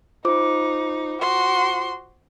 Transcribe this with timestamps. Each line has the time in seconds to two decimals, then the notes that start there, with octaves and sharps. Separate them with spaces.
0.25 D#4 F4 C5 D6
1.21 F#4 C6